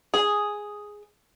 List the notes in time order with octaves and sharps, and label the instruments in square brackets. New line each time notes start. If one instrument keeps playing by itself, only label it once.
[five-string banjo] G#4